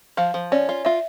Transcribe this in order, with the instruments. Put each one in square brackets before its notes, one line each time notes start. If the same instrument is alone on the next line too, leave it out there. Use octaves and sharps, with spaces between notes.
[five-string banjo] F3 [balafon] F5
[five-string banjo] F3
[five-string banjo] C#4 [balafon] D5
[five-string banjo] F4
[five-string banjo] F4 [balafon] E5